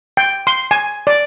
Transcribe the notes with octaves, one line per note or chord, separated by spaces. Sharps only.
G5
C6
G#5
D5